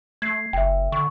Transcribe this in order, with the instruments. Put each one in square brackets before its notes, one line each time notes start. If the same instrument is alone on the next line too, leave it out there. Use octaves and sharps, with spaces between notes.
[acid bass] A3 [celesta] G#6 C7
[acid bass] F#1 [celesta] E5 G5
[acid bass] D3 [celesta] C#6